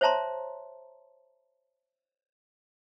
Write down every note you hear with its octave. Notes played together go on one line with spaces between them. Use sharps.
C5 C#5 E5 A5 A#5 C6